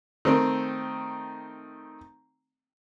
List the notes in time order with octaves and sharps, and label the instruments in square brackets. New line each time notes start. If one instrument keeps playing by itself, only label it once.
[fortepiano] D#3 A3 C4